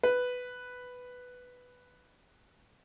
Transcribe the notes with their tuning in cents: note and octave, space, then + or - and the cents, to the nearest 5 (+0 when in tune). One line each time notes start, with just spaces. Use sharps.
B4 +5